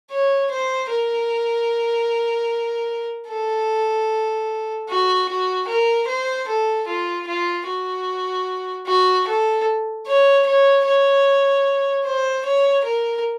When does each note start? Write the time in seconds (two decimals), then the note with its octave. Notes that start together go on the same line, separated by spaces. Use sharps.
0.11 C#5
0.51 C5
0.90 A#4
3.29 A4
4.89 F#4
5.29 F#4
5.68 A#4
6.08 C5
6.48 A4
6.87 F4
7.27 F4
7.67 F#4
8.87 F#4
9.27 A4
10.07 C#5
10.47 C#5
10.86 C#5
12.05 C5
12.45 C#5
12.85 A#4